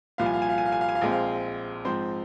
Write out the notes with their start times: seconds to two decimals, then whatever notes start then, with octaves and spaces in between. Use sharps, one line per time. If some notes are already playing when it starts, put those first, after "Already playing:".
0.18 C2 A#2 F3 F5
0.26 G#5
0.34 F5
0.42 G#5
0.49 F5
0.58 G#5
0.66 F5
0.72 G#5
0.81 F5
0.89 G#5
0.95 F5
1.01 A#1 A#2 G#3 C4 G#5
1.11 F5
1.85 G#2 F3 C4 C5